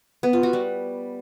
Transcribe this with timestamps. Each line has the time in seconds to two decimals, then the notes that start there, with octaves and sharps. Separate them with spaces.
0.23 B3
0.33 F4
0.43 F#4
0.53 G3